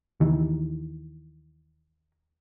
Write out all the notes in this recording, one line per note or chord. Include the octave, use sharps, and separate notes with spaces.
D#2 D#3 E3